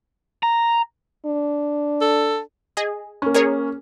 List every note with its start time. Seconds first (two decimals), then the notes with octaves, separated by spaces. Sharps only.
0.43 A#5
1.26 D4
2.01 A4
2.77 G#4 D#5
3.22 A#3 C#4
3.34 G#4 A#4 C#5